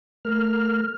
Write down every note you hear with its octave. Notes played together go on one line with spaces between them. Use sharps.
A3 A#4 F6